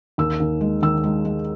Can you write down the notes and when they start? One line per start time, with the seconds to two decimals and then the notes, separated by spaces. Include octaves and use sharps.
0.18 D#2 E6
0.40 D#2
0.61 G#3
0.82 D#3 E6
1.04 G#3
1.25 G#3